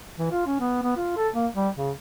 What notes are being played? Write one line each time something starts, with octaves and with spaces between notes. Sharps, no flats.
E3
F4
C#4
B3
B3
F4
A4
A#3
G3
C#3